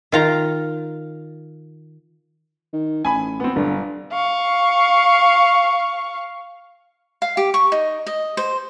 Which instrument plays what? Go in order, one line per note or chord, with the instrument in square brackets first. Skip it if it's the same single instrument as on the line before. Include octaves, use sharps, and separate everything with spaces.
[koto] D#3 F4 A#5
[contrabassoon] D#3
[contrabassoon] A1 [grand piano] G#5 B5
[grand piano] B3 C4
[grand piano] G1 [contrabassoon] D3
[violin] F5 C#6
[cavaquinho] F5
G4
C#6
D#4
D#5
C5